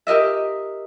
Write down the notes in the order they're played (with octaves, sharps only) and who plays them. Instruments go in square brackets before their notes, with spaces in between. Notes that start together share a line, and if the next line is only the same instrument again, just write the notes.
[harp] G4 A#4 D#5 E5